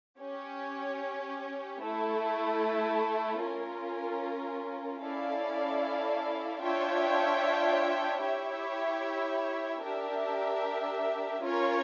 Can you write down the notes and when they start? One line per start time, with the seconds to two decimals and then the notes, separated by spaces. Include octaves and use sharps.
0.20 C#4 G4 C#5
1.81 A3 E4 A4
3.41 C#4 F4 A#4
5.01 C#4 E4 A4 D5 F5
6.61 D4 F4 C#5 E5 G5
8.21 E4 G4 C#5 E5 G5
9.82 D4 G4 A#4 E5
11.42 C#4 F4 A#4 C#5